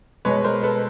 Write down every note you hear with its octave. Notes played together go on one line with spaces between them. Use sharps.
B2 G#3 B4 C#5
A#4 C5
A4 B4